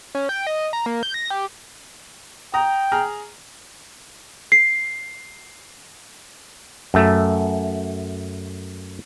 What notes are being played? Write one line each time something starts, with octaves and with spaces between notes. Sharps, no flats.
C#4
G5
D#5
A#5
A#3
G6
A#6
G4
G5 A#5 D#6
G#4 A#5 F6
C7
F#2 A3